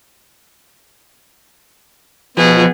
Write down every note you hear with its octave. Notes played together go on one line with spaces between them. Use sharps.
B2 F3 B3 G#4